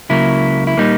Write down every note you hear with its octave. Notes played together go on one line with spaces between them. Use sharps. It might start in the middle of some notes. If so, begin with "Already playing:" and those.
C#2 C#3 F#3 A#3 E4
E4
A#2 G3 A#3 D#4